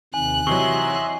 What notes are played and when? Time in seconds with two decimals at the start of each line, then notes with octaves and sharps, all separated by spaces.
0.14 D#2 C3 D#3 G#5 F#6
0.47 C3 E3 F#3 D#5 E5 C6 C#6